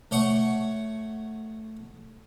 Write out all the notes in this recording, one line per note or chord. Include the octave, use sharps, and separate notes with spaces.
A3 C#5 F#5 C#6